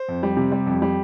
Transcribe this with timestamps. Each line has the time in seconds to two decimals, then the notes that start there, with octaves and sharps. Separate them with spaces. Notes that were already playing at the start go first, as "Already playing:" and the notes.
Already playing: C5
0.08 F2
0.23 G3
0.37 C3
0.52 G3
0.66 F2
0.82 G3